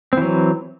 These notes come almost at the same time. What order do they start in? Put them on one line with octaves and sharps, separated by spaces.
C4 E3 F#3